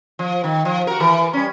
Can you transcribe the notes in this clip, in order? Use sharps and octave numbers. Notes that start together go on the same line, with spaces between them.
F3
D#3
F3
F#4 A#4
E3 A#4
G3 C#4